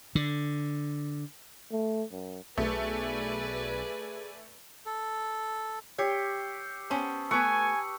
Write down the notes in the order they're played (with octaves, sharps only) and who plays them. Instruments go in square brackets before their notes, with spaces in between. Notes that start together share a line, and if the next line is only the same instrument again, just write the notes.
[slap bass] D3
[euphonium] A3
F#2
[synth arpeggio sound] B1 [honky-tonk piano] A3 [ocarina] G#4 [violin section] B4 D5 G#5
[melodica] A4
[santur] G4 [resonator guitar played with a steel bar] C#5 [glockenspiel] E6 C7 C#7
[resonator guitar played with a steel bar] B3 C#4 C5 [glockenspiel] A5 C#6 D#6
[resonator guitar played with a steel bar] A3 B3 [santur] B4 C#6 [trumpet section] G#5 [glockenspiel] E6